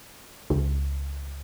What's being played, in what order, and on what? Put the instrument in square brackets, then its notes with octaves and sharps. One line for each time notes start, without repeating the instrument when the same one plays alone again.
[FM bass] C#2